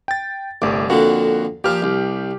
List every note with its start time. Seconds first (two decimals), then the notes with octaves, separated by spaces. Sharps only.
0.08 G5 A6
0.62 G1 C2 A3 D6
0.90 F2 A#2 D3 F#4
1.64 A#2 F3 G4 F6
1.82 C2